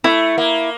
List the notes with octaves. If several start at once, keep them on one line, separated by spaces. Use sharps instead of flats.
A3 E4
A#3